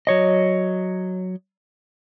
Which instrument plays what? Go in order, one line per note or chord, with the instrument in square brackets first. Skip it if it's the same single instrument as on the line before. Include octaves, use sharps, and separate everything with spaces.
[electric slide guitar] F#3 C#5 D#5